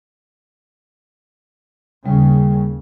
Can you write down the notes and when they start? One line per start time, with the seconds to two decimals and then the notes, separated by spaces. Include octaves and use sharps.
2.06 D#2 C#3 G3